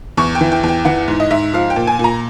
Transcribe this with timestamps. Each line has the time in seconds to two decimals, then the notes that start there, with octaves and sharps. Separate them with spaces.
0.17 E2 C#6
0.35 G5
0.41 E3
0.52 G5
0.63 E2 G5
0.85 E3 F#5
1.08 G#2
1.20 D#5
1.31 G#2 E5
1.53 F3 F5
1.70 G5
1.76 A#2
1.87 G#5
1.99 A#2
2.04 A#5